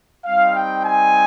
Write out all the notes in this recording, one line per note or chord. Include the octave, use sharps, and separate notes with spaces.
G3 C4 D#4 F5
G5
G#5